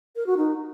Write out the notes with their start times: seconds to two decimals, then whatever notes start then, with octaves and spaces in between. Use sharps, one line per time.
0.16 A#4
0.27 F#4
0.37 D#4